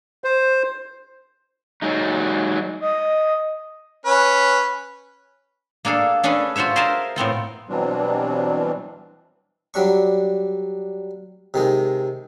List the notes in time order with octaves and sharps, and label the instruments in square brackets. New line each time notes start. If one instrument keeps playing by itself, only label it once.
[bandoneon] C5
[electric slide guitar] F#3 G#3 D#4
[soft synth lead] D#5
[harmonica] C#4 B4
[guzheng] A#3 D4 G#4 A4
C#4 D4 G#4 A4 B4
F4 F#4 C5 C#5 E5
G#4 A#4 C5 E5 G#5 A5
A2 B3 C4 F4
[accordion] B2 E3 F#3 G3 C4 D4
[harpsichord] F#3 G3 D4 C#6
C3 D#3 G#3